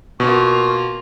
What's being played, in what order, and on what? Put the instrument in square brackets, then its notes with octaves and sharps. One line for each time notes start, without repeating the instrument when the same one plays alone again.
[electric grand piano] B2 [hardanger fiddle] A#3 F4 [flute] C#6